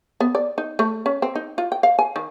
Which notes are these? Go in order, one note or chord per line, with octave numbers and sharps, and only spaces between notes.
B3
D5
D#4
A3
C#4
C4
D#4
F4
G5
F5
G#5
D#3